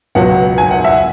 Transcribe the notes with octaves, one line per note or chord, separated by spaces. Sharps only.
C#2 B2 F#3 F#5
G#5
F#5
E5